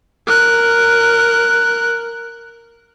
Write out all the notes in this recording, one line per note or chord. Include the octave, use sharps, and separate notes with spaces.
A#4 F#6